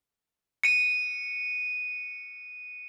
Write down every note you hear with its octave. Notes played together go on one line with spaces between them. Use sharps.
C#7 D#7